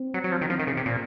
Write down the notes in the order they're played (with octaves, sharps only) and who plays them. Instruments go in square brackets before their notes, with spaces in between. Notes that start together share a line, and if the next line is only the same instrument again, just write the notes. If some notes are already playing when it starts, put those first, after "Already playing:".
Already playing: [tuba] C4
[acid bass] F#3
F#3
F3
D#3
[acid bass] F3 [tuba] C4
[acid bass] D#3
C#3
C3
A#2